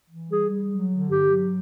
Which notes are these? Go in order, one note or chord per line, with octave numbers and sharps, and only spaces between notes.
E3
G3 G#4
G3
F#3
D3
G2 G4
F#3